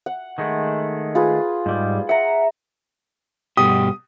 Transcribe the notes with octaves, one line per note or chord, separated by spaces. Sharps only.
F#5
D#3 G#3 A3
F4 G#4 B4
G#2 G3
E5 F#5 A#5
G2 B2 G4 D#6